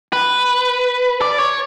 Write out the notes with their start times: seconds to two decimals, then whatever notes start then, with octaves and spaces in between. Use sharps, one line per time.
0.13 B4
1.22 D5
1.39 C#5